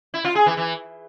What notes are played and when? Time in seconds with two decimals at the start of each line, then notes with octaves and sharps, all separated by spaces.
0.14 E4
0.25 F4
0.35 G#4
0.46 E3
0.57 E3